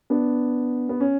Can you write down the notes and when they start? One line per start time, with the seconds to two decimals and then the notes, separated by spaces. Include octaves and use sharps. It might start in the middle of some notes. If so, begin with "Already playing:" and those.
0.10 B3 D4
0.89 B3
1.00 C#4